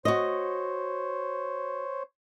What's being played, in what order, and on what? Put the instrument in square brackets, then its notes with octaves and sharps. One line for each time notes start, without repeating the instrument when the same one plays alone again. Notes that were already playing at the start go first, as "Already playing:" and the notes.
[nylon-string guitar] F#4 D#5 [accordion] C5 C#5